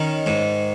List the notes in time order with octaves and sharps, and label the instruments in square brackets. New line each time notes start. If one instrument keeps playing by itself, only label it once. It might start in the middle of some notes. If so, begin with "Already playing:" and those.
Already playing: [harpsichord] D#3 C#4
G#2